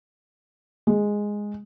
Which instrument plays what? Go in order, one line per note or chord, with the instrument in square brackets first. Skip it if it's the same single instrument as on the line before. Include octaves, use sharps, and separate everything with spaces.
[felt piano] G#3